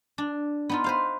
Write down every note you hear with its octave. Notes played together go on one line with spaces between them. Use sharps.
D4
B3 D#4 F4
B4 C5 F5